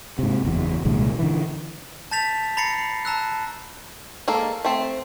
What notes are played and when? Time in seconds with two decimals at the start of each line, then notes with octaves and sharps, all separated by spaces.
0.19 G#2 C3
0.45 F#1 E2
0.85 C2 A#2 D#3 G#3
1.19 D3 E3
2.11 A5 G6 A6 B6 F7
2.57 A#5 B5 A6 A#6 C7 C#7
3.05 A5 A#5 E6 F#6
4.28 G#3 A#3 A4
4.65 A3 C4